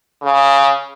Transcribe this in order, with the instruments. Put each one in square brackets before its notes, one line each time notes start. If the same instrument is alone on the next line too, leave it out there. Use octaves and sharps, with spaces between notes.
[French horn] C#3